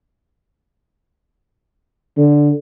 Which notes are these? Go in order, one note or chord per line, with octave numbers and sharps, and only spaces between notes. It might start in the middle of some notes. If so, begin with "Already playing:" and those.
D3